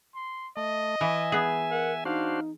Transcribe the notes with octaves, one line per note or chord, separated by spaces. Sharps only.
C6
A3 D#5
E3 E5 G#5
B3 G#4
A#4 F#5
D4 D#4 F#4 C5 F5